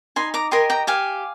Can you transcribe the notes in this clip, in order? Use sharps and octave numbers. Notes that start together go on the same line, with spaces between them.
D#4 G#5 C6
A#5 D6
G4 A#4 D#5 G#5 C6
G5 A#5
G4 F5 G#5